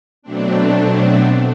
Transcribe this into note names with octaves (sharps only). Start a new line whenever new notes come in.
B2 F#3 A3 C4 D4